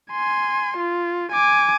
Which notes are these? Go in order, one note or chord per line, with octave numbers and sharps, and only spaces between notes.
G#5 C6
F4
G#5 D6